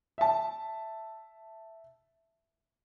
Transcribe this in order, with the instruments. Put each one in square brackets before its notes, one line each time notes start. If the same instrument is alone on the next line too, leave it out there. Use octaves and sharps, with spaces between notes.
[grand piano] E5 A5